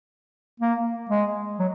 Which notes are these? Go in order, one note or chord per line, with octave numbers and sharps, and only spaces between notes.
A#3
G#3
F#3